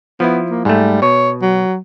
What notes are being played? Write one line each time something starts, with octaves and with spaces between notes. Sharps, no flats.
F3 B3 E4
A#3
G#2 G3 A3
B2 C#5
F#3